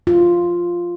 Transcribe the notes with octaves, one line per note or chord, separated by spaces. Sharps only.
F4